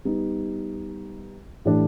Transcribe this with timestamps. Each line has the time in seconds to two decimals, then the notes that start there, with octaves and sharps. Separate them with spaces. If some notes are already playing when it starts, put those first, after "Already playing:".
0.05 G3 B3 D#4
1.65 A2 E3 A3 D4 G4